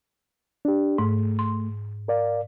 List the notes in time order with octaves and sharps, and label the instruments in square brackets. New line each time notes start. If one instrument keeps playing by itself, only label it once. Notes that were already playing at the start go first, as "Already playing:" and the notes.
[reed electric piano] D4 G4
[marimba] G#2 [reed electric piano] A3
[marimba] C6
[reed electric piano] A#4 D5 F5